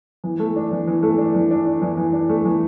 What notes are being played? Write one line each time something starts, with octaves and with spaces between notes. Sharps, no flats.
E3
A3
D4
E3
E3
A3
D4
E3
D4
D4
E3
E3
D4
A3
E3